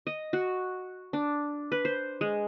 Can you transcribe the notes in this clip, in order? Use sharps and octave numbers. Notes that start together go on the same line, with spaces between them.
D#5
F#4
D4
B4
C5
G#3